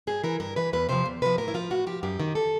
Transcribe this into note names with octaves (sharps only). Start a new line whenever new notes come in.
G2 G#4
E3 A#4
G2 A#4
E3 B4
E2 B4
C3 F3 C5
E2
C3 F3 B4
A2 A#4
E4
F3 F4
A2 F#4
F3 G4
F#2 G4
D#3
A4